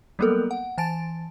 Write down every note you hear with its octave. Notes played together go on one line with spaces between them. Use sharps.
F#3 G3 A#3 B3 A4 A#4
F#5
E3 G#5 A5 A6 D7